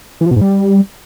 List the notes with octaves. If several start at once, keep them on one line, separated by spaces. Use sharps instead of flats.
E3
F3
B2
G#2
G3